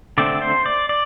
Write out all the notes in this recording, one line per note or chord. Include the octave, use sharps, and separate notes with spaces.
D3 A3 C4 D5
C5
D5
D5